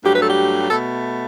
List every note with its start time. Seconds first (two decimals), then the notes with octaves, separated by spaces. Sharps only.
0.03 G2 F#3 A3 G4
0.12 B4
0.21 A4
0.29 G4
0.70 B2 A3 A4